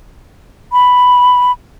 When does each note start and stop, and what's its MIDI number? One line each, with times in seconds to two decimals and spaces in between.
0.72 1.52 83